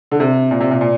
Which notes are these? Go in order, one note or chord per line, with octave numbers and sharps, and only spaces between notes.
D3
C3
A#2
C3
A#2
A#2